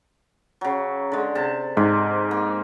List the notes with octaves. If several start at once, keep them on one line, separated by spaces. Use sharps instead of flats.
C#3 F#3
D3 G#3
C3 A5
G#2 C3
A#3